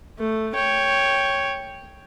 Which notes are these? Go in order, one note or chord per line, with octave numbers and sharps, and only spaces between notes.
A3
C#5 G5